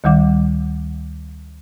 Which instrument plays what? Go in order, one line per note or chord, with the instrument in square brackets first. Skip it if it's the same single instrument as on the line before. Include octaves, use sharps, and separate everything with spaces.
[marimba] D2 D#3 G3 F#5 D6